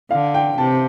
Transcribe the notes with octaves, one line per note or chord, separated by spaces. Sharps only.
D3 F5
G5
C3 A5